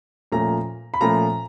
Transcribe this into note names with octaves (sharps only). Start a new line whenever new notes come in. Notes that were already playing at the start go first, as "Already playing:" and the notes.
A#2 F3 A3 C#4 A#5
B5
A#2 F3 A3 C#4 A#5